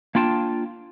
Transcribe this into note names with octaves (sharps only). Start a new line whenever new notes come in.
A#3 D4 F4 G5 A5